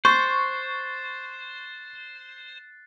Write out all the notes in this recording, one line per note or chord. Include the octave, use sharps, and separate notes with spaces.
C5 C#6 F#6 A6 C7